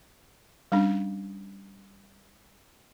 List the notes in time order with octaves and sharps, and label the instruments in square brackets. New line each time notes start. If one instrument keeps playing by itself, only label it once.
[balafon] G3 C#4 D4